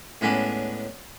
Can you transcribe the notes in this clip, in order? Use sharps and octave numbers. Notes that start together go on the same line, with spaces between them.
A2 G#3 B3 C#4 D4